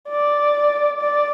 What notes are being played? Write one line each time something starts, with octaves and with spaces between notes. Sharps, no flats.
D5
D5